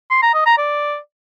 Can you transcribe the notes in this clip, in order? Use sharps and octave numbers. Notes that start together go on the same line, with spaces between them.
C6
A#5
D#5
A#5
D5